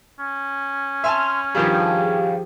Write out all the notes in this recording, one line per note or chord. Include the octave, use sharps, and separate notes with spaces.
C#4
E5 G#5 A5 C6 F6
G2 D#3 F3 G3 G4 G#4 F5